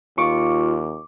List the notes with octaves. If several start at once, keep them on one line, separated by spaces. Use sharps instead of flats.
D#2 F4 C#6 D6